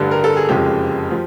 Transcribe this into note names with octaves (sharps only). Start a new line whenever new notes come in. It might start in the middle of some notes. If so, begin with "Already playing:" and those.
Already playing: A1 G2 D3 G3
A#4
A4
G#4
F#1 F2 C#3 F3 G#3 G4
F3